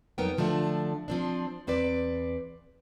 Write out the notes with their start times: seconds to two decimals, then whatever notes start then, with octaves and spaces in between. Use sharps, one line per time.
0.18 F2 F#3 B3 D#4 A#4 G5
0.38 D3 F3 A3 D4
1.08 F3 C4 D4
1.67 E2 C4 B4 D5